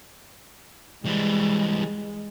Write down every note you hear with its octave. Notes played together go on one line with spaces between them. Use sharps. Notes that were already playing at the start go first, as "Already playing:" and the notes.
E3 G3 G#3